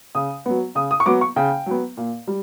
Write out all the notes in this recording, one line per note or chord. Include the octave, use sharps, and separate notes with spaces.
C#3 D#6
F#3 B3
C#3 D#6
D#6
C#6
F#3 B3 D6
C#6
C#3 G5
F#3 B3
A#2
G3